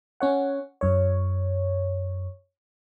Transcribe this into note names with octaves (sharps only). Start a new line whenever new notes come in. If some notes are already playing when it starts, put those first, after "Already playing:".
C#4 C#5 F#5
F#2 C#5